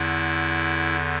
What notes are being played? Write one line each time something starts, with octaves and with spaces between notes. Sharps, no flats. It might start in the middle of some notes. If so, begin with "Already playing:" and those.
Already playing: E2 D3 E4